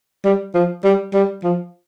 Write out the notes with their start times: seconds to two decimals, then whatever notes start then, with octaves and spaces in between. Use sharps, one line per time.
0.25 G3
0.54 F3
0.84 G3
1.14 G3
1.44 F3